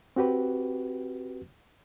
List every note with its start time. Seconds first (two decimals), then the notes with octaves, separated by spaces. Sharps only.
0.16 C4 F#4 G4 B4